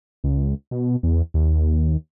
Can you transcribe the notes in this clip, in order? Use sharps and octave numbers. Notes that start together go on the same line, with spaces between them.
C#2
B2
E2
D#2